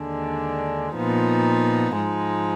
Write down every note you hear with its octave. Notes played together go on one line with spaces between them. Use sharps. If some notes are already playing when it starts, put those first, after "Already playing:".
Already playing: D#2 D3 G#3 D4
A#2 F3 B3 D#4
G#2 F3 G#3 D#4